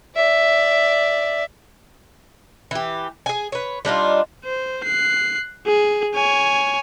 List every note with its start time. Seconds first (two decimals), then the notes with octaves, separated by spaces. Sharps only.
0.17 D5 E5
2.71 E3 G4
3.26 G#4 G#5
3.52 B4 C#5
3.85 G3 D4 D#4 F4
4.45 C5
4.84 F#6 C7
5.67 G#4
6.14 C#5 G#5